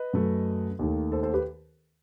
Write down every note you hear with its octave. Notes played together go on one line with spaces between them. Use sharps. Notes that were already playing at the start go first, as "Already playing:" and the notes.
Already playing: B4 D#5
F#2 F#3 A3
D#2 D#3 A3
A4 C5
A4 C5
G4 B4